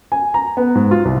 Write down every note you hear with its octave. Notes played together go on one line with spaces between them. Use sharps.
G#5
A#5
B3
G#2
F4
C2